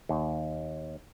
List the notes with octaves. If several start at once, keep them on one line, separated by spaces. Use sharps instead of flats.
D#2